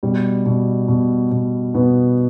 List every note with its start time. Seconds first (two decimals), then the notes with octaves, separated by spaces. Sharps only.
0.03 B2 G3
0.46 B2
0.88 B2
1.32 B2
1.74 B2 B3